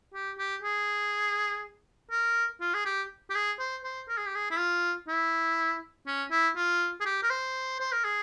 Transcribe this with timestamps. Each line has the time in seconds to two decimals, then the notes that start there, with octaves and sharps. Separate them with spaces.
0.14 G4
0.38 G4
0.63 G#4
2.11 A#4
2.61 F4
2.74 G#4
2.86 G4
3.30 G4
3.35 G#4
3.60 C5
3.84 C5
4.09 A#4
4.18 G#4
4.26 G4
4.35 G#4
4.51 E4
4.58 F4
5.08 E4
6.07 C#4
6.31 E4
6.56 F4
7.01 G#4
7.05 G4
7.23 A#4
7.30 C5
7.80 C5
7.93 A#4
8.04 G#4